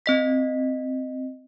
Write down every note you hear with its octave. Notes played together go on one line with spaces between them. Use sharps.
C4 D#5 B6